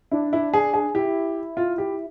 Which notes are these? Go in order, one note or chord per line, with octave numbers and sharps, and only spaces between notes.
D4 E4
E4
G#4
G#4
E4 G4
F4
G4